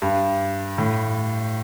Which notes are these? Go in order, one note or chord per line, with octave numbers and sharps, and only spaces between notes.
G2
A2